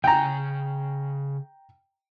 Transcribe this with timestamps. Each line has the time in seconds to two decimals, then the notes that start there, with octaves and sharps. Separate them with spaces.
0.04 C#3 G5 G#5 A#5